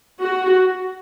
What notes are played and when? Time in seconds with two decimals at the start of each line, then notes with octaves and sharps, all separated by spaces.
0.21 F#4